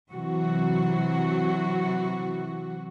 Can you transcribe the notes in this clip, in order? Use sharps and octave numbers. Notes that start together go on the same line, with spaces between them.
C3 E3 F#3 F#4